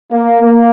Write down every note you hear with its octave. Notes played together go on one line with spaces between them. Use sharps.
A#3
A#3